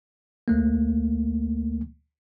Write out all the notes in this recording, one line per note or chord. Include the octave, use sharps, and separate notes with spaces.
D2 A3 A#3